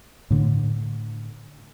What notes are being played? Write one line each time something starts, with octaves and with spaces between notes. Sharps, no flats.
A2 D3